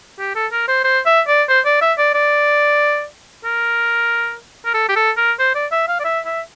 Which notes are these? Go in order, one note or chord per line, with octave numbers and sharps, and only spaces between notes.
G4
A4
A#4
C5
C5
E5
D5
C5
D5
E5
D5
D5
A#4
A#4
A4
G4
A4
A#4
C5
D5
E5
F5
D5
E5
E5